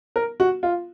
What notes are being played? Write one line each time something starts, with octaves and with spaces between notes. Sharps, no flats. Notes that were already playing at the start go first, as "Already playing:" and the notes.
A#4
F#4
F4